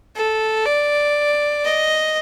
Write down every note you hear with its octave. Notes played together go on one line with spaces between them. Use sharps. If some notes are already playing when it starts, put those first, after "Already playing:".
A4
D5
D#5